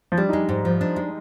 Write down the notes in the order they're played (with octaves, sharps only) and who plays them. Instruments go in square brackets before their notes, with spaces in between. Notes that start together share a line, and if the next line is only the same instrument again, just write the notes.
[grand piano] F3
[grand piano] G3 [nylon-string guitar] D4
[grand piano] D#4
[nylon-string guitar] G#3
G#2
F3
D4
G#3